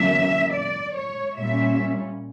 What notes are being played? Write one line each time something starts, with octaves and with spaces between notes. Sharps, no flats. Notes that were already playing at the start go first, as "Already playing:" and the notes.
Already playing: E2 D3 F#3 A#3 C#4 E5
D5
C#5
A#2 G3 C#4 E5